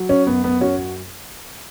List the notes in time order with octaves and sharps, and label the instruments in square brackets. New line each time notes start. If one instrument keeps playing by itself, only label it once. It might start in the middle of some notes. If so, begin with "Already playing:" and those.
Already playing: [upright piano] F#3
[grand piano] C#4
[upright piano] F#2 [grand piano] B3
[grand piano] B3
[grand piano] C#4 [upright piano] F#4